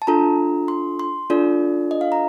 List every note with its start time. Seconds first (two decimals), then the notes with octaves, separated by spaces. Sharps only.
0.02 A5
0.07 D4 F4 A4 A#5
0.68 C6
0.99 C6
1.30 D4 F4 A4 D5
1.91 D#5
2.01 F5
2.12 A#5